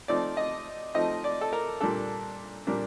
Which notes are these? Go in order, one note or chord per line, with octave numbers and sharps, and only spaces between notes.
F3 A3 C4 D#4 D5
D#5
F3 A3 C4 D#4 D#5
D5
A4
A#4
A#2 G3 A#3 D4 A4
A#2 G3 A#3 D4